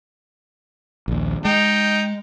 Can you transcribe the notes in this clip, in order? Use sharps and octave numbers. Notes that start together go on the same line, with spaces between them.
A#1 D#2
G#3 D#4 G5